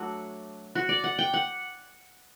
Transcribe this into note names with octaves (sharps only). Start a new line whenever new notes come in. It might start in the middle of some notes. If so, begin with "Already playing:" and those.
Already playing: F#3 A3 D4 F#4
F#4
D5
F#5
G5
F#5